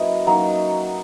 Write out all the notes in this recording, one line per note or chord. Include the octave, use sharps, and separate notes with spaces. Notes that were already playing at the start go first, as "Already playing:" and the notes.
Already playing: F#3 A#3 C#4 E4 B4 D#5
F#3 A#3 D#4